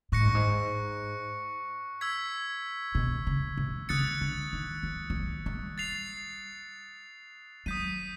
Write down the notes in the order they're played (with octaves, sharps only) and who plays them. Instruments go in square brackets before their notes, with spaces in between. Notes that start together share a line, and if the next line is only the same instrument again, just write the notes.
[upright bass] A2 [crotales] C#6 F#6 A#6 C#7
[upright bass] G#2
G2
G#2
[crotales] E6 G#6 B6
[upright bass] B2
C#3
C3
[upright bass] C#3 [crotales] D#6 F#6 A6 C#7
[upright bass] D3
D#3
F3
F3
F#3
G3
[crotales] A6 C7 F7
[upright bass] F#3 [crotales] D#6 G6 B6 D#7